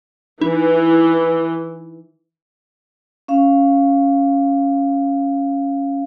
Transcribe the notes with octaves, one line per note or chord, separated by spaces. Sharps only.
E3 D#4
C#4 F5